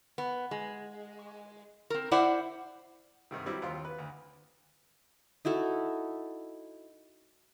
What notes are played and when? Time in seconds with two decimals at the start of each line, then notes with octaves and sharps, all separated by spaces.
0.18 B3
0.51 G#3
1.90 C4 A#4
2.11 E4 C5 D5 E5 F#5
3.31 G2 C3 D#3
3.46 F#3 G3 C4 E4
3.62 D#2 C4 F4 C6
3.85 B4
3.98 D2
5.45 D#4 E4 F#4 A4